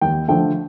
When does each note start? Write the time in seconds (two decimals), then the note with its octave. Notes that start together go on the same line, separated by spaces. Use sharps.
0.01 D#2 G5
0.28 D3 F3 A3 G5